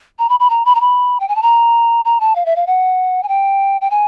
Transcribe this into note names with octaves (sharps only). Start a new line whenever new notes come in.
A#5
B5
B5
A#5
B5
A#5
B5
G5
G#5
A5
A#5
A#5
A5
F5
E5
F5
F#5
G#5
G5
G5
G#5